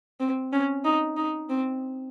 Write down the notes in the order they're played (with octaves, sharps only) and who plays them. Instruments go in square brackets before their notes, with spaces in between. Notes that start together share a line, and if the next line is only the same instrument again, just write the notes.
[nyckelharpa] C4
C#4
D#4
D#4
C4